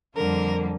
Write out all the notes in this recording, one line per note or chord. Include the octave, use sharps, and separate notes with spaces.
F2 D3 G3 A#3 A#4